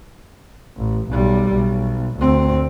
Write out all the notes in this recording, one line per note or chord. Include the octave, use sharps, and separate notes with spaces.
A1
B1 G3
B1
D2 C4